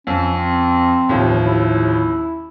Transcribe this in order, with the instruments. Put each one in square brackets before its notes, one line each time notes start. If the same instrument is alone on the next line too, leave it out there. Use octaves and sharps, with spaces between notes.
[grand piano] F2 [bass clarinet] C#4
[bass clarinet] C4
[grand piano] A1 D#2 F3
[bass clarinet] E4